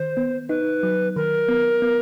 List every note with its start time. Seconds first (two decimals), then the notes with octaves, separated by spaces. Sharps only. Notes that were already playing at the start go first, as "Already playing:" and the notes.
Already playing: D#3 C5
0.17 B3
0.49 D#4 B4
0.83 F#3
1.16 D#3 A#4
1.48 B3
1.82 B3